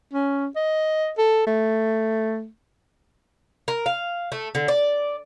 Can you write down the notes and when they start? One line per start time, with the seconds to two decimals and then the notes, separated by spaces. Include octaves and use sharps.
0.14 C#4
0.56 D#5
1.18 A4
1.47 A3
3.68 A#4
3.86 F5
4.32 A3
4.55 D3
4.68 D5